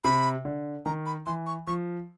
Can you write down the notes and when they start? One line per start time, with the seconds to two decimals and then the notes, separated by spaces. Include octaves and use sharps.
0.04 C3 B5
0.45 D3
0.86 D#3 A#5
1.06 B5
1.26 E3 C6
1.46 C#6
1.67 F3 C#6